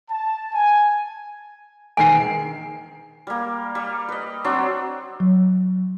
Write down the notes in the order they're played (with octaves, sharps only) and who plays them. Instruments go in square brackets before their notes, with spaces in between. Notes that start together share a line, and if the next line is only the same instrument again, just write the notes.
[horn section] A5
G#5
[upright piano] E1 D#3 C7 [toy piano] G#5
[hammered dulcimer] G3 A#3
G3
B4 D#5
F#3 C4 D4
[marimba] F#3